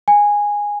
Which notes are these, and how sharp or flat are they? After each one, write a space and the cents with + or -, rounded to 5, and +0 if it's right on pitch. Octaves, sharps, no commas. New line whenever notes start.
G#5 -10